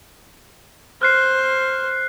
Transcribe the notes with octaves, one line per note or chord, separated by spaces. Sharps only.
C5 F6 F#6 C7